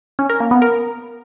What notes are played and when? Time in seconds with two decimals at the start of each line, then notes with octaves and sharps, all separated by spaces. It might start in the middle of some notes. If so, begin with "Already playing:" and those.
0.19 C#4
0.30 A#4
0.40 A#3
0.51 B3
0.62 A#4